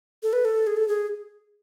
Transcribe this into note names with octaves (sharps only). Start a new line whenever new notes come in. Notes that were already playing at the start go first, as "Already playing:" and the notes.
A4
B4
A4
G#4
A4
G#4